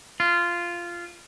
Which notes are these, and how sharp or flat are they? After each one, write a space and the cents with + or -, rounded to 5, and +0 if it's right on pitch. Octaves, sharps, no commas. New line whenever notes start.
F4 -10